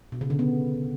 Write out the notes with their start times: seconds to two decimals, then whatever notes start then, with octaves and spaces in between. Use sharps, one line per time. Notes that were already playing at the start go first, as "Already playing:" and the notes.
0.12 B2
0.21 C#3
0.30 D3
0.39 B3